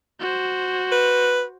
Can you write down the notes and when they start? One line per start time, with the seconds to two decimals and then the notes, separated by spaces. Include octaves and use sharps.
0.20 F#4 C5
0.92 B4